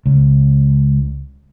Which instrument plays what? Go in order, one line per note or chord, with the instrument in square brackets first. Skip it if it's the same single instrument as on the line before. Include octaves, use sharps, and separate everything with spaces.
[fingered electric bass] C#2